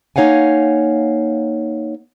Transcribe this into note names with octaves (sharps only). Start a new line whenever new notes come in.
A#3 D#4 C#5 F5 F#5 G#5